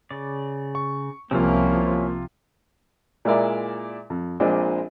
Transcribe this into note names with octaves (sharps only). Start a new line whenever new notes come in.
C#3 D5
C#6
C2 C3 F3 A#3 C4 C#4 E4 F4
A#2 G#3 E4 A#4 D5 E5
F2
A#1 A#2 G#3 C4 D4 D#5